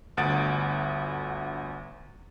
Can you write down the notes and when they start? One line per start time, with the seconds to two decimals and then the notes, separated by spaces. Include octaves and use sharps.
0.17 G1 D2 F#5 D#6 A6 D7